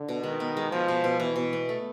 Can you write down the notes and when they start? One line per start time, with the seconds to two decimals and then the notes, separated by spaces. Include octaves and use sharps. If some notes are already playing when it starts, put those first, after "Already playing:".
Already playing: D3
0.09 B2
0.23 D#3 G#3
0.40 B3
0.57 G#3
0.72 B2 F3
0.88 B2
1.04 B2
1.20 B2 E3
1.36 B2
1.53 B3
1.69 A3